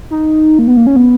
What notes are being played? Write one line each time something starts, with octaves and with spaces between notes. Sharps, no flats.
D#4
A#3
B3
A#3
C#4
B3